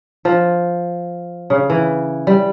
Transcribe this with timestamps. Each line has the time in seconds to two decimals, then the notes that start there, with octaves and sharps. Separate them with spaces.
0.25 F3
1.50 C#3
1.70 E3
2.27 G3